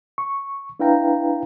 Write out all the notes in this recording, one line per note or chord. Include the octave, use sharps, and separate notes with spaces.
C#6
D4 E4 B4 F5 G5 A#5